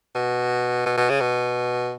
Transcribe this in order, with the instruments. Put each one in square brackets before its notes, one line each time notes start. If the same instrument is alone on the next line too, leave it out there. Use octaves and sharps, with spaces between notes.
[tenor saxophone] B2
B2
B2
C#3
B2